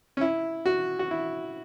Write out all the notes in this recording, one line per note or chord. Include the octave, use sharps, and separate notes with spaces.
C#4
E4
F#4
F#4
E4